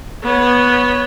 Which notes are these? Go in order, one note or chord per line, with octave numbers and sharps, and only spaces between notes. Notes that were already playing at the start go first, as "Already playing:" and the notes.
B3 C#5